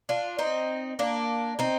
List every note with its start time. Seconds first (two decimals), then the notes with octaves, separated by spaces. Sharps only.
0.09 D4 F4
0.39 C4 D#4
0.99 A#3 D4
1.59 C4 D#4